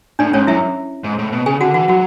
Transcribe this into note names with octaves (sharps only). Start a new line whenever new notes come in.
A2 D4 D5
G#2 C#4 C#5
F#2 E4 E5
G#2
A2
B2
C#3 G#4 G#5
D3 F#4 F#5
E3 F#4 F#5
F#3 F#4 F#5